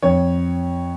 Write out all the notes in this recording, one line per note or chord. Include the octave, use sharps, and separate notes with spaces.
F2 C#5